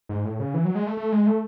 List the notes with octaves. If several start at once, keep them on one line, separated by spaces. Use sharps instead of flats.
G#2
A2
C#3
E3
F#3
G#3
A3
A3
G#3
A3